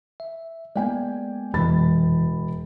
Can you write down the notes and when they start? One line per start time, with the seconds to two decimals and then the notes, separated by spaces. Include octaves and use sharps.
0.20 E5
0.76 G#3 A#3 B3 D5 G5 G#5
1.54 E1 F2 C3 E3 B5 A6